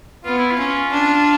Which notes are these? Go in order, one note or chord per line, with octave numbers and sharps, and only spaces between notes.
B3 F4
E4
F4
C#4
D4